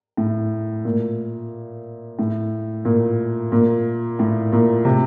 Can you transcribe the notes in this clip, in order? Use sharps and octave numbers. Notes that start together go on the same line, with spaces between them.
A2
A#2
A2
A#2
A#2
A2
A#2
C3